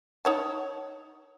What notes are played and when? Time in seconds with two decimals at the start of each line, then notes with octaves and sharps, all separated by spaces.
0.25 D#4 C#5 A5